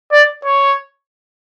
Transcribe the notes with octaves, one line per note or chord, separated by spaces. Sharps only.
D5
C#5